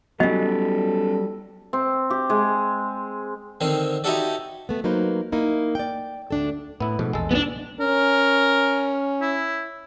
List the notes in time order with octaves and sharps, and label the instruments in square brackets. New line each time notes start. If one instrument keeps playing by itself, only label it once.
[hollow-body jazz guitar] F#3 G3 [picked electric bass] B3 C#4 [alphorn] A4 [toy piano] D#5
[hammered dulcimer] C4
G4
G#3
[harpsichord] D3 D#3 C4
D#4 E4 F#4 G4 A4 D5
[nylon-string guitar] A3 B3
F#3 A#3 D#4 B4 C5
A#3 D#4 E4
D5 G5
D2 D4 A4
[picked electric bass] A2 [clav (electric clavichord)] B3 E4
[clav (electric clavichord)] G#2 [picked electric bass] B2 F3 A3
[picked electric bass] A#1 E2 [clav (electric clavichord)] G#3 A4
[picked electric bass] C2 F2 [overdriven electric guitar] B3 D4
[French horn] C#4 [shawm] A#4
[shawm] E4